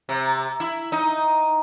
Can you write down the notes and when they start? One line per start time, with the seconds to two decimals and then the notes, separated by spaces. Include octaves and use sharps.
0.09 C3
0.60 E4
0.92 D#4